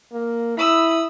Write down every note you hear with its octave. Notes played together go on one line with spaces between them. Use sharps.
A#3
E4 B5 D#6 E6